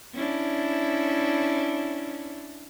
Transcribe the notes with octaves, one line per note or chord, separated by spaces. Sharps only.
C#4 D4 E4